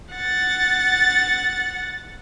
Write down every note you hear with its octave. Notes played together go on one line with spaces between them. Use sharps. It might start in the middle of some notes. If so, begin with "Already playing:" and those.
F#5 A6